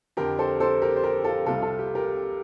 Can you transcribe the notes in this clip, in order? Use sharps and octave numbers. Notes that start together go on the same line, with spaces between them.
F2 D3 F3 G4 A#4
A4 C5
A4 C5
G4 A#4
C5
G4 A#4
F4 A4
C2 C3 G3 F4 A4
F4 A4
G4
G4 A#4